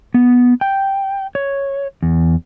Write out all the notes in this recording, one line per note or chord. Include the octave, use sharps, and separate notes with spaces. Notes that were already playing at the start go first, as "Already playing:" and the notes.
B3
G5
C#5
E2